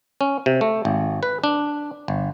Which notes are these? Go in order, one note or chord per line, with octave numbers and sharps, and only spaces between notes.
C#4
C3
A3
G#1
B4
D4
G1